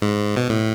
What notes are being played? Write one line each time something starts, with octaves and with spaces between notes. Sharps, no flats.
G#2
B2
A2